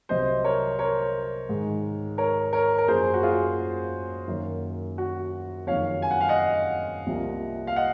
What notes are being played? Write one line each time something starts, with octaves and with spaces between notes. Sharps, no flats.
C2 C3 F#3 C4 C5 D#5
A#4 C#5
A#4 C#5
G#2 D#3 G#3
A#4 C#5
A#4 C#5
A#4
F#2 F3 A#3 C#4 G#4 C5
F#4
F4 G#4
F#2 D#3 F#3 A#3 C#4
F#4
F#1 F2 D#3 F#3 C#5 F5
G#5
F#5
F5
D#5 F#5
C2 C3 F3 A#3
F5
D#5 F#5